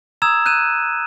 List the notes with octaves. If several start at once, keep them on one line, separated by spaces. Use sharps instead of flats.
A#5 D#6 E6 G#6 E7
F#6 G6 D#7 E7